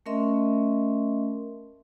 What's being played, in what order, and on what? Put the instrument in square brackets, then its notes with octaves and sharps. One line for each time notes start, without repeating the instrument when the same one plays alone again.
[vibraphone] A3 C#4 A#4 D#5 E5 C6